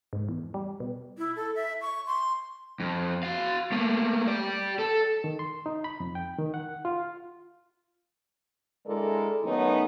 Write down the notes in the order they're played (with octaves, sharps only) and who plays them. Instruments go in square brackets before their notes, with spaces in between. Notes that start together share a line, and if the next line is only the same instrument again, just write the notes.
[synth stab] G#2
E2
G3
B2
[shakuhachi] E4
A4
E5
C#6
C6
[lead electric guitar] F2
F#4 F5
A3 A#3
G4 D5
A4
[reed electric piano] D#3
C6
D#4
B5
F2
G5
D#3
F#5
F4
[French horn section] D3 G#3 E4 A4 A#4 D5
D#3 F#3 A3 B3 C#4 D#4